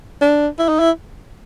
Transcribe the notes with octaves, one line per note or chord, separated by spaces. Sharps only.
D4
E4
D#4
E4